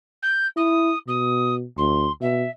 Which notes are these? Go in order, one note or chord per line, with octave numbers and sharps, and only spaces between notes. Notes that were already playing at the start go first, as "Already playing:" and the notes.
G6
E4 D#6
B2 D#6
D2 C6
B2 E5